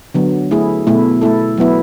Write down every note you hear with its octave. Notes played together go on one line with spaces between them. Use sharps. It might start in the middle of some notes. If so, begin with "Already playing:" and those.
D3 F#3 B3
A3 E4 G#4
B2 A3 E4
A3 E4 A4
F#3 B3 E4